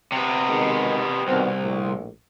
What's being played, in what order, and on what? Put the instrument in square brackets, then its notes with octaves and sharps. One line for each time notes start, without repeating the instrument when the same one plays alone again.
[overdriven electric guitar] C3 B3
[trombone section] B2 D#3 G#3
[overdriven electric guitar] C2 [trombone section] B2 D#3 C4
[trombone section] A#1 A2